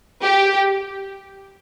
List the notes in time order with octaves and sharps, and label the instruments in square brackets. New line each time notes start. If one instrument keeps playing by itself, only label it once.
[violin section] G4